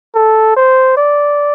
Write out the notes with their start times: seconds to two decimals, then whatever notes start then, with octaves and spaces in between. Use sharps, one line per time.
0.15 A4
0.57 C5
0.97 D5